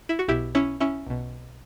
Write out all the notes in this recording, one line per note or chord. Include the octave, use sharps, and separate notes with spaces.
E4
F#4
B1 B2 E4 G4
C#4 E4
C#4 E4
B1 B2